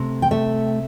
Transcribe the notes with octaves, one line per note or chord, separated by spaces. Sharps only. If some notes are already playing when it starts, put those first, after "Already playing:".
Already playing: C3 A3
G5
A3 E5